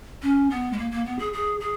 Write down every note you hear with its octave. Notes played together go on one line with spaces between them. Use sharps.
C#4
B3
G#3
A#3
A#3
B3
G#4
G#4
G#4